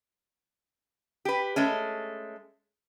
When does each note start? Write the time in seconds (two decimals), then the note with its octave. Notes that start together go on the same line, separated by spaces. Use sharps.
1.25 G4 B4
1.56 G#3 A3 C#4